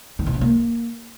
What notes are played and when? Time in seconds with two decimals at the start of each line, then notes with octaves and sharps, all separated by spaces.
0.19 D#3
0.26 B2
0.34 C#3
0.41 A#3